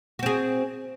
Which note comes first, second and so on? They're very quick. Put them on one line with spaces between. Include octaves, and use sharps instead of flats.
F#4 C4 G#4